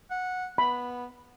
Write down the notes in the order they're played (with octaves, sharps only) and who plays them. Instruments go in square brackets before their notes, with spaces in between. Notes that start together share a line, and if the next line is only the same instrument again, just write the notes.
[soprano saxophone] F#5
[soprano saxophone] B3 [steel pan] B5